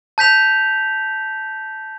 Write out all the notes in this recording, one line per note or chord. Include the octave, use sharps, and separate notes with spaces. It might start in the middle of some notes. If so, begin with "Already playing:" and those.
A5 G6 B6 F7